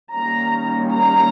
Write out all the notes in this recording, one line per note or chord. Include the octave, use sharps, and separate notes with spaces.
D#3 G3 A#3 C#4 A#5
A#5